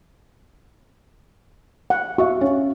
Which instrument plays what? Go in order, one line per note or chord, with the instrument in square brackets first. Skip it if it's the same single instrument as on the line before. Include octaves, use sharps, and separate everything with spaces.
[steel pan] F#5
[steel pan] F#4 [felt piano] E5 F5 C#6
[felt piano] C#4 C#5